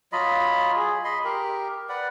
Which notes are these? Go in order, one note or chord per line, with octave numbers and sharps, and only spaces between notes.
F#3 F4 D#5 B5
G#4
D#5 B5 C6
G4 A#4
B4 D5 F#5